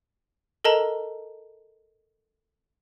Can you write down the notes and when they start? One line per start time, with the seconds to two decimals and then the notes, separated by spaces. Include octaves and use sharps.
0.65 A4 A#4 D#5 A5 A#5